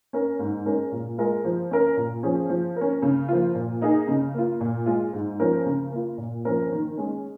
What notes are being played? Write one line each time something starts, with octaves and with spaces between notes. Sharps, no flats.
C#4 A#4
G#2
G#3 C#4 A#4
A#2
G#3 F4 A#4
F3
C#4 A#4
A#2
F3 C#4 G#4
F3
C#4 A#4
C#3
F3 A#3 F4
A#2
A#3 D#4 G#4
C#3
A#3 F4
A#2
G#3 F4
G#2
F3 C#4 A#4
C#3
A#3 F4
A#2
F3 A#3 C#4 A#4
D#3
G#3 C#4